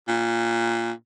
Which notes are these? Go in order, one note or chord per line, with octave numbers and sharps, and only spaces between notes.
A#2